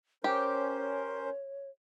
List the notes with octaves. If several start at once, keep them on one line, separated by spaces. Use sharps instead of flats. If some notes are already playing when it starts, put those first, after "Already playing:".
C#4 G4 A#4 C5 C#5